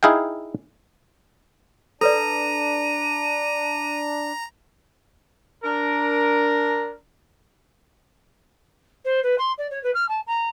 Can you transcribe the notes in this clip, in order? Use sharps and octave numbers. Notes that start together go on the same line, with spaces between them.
D#4 E4 G#4 F5 G5
D4 A4 B4 D5 A#5 D#7
D4 A#4
C5
B4
C6
D5
C#5
B4
F6
A5
A#5